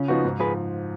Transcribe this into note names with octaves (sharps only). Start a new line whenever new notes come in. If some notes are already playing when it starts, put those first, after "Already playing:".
Already playing: C#3 C#4 F4
F3 B3 D#4 F#4
G#2
F3 G#4 B4